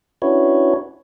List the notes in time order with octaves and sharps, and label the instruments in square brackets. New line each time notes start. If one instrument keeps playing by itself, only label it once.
[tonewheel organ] C#4 D4 E4 F#4 B4 C#5